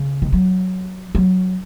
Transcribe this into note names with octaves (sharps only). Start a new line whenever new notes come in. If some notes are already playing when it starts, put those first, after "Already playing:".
Already playing: C#3
D#3
F#3
F#3